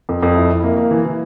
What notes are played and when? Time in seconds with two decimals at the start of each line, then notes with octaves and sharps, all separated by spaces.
0.09 F2
0.23 F2
0.36 E4
0.50 E4
0.64 A#3
0.77 A#3
0.91 E3
1.05 E3